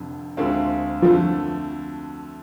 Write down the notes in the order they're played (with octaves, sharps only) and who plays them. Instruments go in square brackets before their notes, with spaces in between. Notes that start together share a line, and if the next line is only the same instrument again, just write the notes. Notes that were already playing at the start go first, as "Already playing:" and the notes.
Already playing: [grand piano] F1 F2 D3
D2 D3 G#3 C4 F4
[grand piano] F2 D3 A3 [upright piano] F3